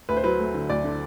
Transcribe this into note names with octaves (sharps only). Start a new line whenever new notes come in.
D2 B4
C5
F#3 B4
A3
D3
D2 D5
D3